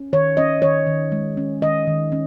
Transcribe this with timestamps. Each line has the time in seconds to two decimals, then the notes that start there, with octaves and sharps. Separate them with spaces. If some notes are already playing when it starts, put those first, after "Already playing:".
Already playing: C#4
0.13 D#3 C#5
0.37 C#4 D#5
0.62 D#3 C#5
0.87 D#3
1.12 G#3
1.37 C#4
1.62 D#3 D#5
1.87 D#3
2.12 C#4